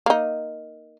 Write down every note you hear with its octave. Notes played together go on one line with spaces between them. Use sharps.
A#3 D#4